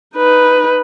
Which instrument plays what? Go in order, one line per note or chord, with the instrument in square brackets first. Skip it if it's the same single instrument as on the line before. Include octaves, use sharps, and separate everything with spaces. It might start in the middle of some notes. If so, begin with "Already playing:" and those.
[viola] D#4 B4